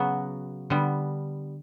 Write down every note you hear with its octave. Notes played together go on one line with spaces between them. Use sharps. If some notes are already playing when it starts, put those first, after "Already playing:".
Already playing: C#3 F#3 B3 F#4
D3 G3 B3